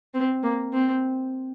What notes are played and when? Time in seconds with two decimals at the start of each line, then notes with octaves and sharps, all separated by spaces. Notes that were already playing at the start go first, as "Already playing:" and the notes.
0.14 C4
0.43 A#3
0.73 C4